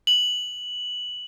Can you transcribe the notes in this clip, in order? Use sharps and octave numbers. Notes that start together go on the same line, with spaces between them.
F#7